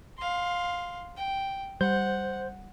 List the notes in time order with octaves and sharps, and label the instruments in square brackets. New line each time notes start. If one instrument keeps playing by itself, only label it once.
[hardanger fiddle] F5 C6
G5
[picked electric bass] G3 [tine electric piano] C5 G6 [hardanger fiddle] F#5